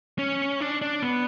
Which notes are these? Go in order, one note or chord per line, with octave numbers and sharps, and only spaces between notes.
C#4
D4
D4
B3